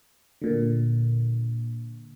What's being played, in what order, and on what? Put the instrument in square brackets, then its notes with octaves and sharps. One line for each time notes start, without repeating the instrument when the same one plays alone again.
[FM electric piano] A#2 D3